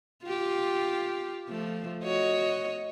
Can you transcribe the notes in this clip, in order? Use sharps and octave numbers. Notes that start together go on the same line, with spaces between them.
F4 G4
F3 A3
F#4 C#5 D#5